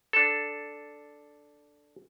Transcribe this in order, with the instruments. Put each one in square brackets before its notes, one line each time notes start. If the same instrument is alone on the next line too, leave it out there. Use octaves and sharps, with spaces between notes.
[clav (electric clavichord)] D4 A4